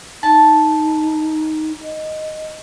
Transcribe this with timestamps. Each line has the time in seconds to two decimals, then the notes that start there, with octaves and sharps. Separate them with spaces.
0.23 D#4 A5
1.82 D#5